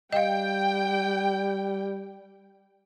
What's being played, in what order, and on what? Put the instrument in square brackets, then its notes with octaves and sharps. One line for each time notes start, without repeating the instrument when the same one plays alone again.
[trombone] G3 [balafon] D#5 F5 [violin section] G5